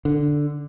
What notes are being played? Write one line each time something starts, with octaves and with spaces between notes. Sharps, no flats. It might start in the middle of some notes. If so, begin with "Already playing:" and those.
D3